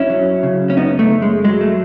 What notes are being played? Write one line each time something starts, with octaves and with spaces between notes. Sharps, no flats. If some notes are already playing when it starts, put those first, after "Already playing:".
Already playing: F#2 C#4 E4
F#3
C#3
C#4
F#2 B3 D#4
A3
F#2
G#3
F#3 G#3
A3